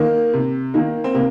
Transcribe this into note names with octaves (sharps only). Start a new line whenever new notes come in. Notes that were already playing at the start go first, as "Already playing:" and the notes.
Already playing: D#3 A#3
C3
D#3 A#3
C4
C3 A#3